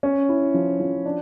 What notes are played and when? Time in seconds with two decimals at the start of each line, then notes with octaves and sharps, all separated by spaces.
0.03 C#4
0.29 E4
0.54 F3
0.80 F3
1.05 D4